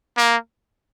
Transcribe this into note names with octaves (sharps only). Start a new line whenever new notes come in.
A#3